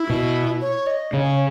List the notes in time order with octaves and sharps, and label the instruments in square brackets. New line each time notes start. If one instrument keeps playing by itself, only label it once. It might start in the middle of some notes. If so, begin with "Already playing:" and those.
Already playing: [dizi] E4
[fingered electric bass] B2
[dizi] C#5
D#5
[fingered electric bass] C#3 [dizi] C#5